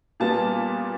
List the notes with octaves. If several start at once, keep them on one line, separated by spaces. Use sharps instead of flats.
A#2 G3 B3 A5